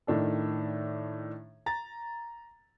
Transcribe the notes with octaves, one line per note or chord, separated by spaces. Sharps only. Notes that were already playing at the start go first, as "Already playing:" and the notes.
A2 D#3 D4 A4
A#5 A6